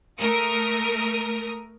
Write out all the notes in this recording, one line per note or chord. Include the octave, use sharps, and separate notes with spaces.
A3 A#4 D#6